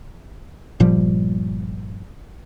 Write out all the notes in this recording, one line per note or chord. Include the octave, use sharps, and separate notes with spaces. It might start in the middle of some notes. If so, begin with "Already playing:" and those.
G1 A#2 F3 G3